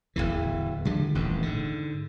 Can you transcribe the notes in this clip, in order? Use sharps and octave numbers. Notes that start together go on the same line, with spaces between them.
D1 B1 E2 E3
D3 F3 G3 G#3
D#1 A1 F2
G#2 D3